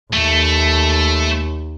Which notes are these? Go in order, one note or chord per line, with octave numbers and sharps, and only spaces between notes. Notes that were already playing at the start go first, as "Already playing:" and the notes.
D#2 A3